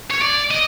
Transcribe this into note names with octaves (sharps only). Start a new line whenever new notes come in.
C#5
D5
D#5